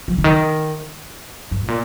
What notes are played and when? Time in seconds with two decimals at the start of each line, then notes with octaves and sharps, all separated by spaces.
0.08 F3
0.18 D3
0.24 D#3
1.51 G2
1.68 A#2